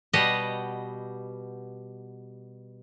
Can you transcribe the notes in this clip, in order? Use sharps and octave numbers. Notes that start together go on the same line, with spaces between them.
B2 G3 G4 D#5 F#5